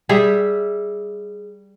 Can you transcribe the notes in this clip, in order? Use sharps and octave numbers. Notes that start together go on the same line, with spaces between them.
G3 G#4 E5